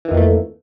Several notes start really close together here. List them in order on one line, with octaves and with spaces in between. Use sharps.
E3 D#3 F2 A#3 A3